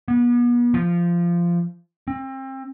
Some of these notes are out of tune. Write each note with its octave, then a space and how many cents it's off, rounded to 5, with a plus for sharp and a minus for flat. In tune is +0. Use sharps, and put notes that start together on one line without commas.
B3 -40
F3 -15
C4 +30